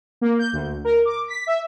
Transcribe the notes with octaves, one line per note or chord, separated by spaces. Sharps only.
A#3
G6
D2
A#4
D6
B6
E5